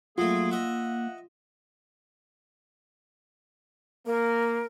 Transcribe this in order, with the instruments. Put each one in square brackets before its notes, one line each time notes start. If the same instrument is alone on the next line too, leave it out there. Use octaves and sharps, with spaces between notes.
[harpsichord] F#3 A3 [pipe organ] A#3 [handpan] F4 [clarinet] G#4
[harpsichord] D#5 E5 [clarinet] F#5
[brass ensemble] A#3 [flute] A#4